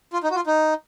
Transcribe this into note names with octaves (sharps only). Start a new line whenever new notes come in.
F4
D#4
F#4
F4
D#4